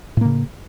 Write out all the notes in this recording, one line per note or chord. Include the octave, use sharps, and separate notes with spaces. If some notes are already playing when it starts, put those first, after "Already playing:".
A2 C#3 A#3